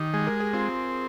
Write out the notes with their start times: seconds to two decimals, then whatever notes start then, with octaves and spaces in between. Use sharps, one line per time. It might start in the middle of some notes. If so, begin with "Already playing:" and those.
Already playing: D#3 G4
0.14 G#3 G#4
0.27 A#4
0.40 G#4
0.53 C4 F4